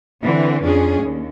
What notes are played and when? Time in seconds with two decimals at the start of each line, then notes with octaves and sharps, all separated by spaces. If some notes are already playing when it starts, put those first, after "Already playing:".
0.23 D3 E3 C4
0.63 F2 C#4 D4 G#4
1.01 D#2